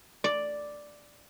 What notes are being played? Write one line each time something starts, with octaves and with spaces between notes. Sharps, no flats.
D5